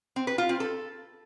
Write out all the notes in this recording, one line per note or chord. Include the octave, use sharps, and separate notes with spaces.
C4
B4
F4
C4
A4